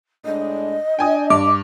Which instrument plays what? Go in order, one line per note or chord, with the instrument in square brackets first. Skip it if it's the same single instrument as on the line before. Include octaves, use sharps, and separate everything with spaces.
[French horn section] A2 G#3 D4 [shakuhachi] D#5
[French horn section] D4 [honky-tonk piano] G5 G#5 D#6
[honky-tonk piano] G2 [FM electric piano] D6